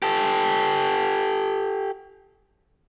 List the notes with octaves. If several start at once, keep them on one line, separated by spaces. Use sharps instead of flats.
G4 A4